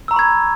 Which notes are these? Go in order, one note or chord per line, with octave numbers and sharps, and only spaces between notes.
A#5 B5 C#6 E6 G#6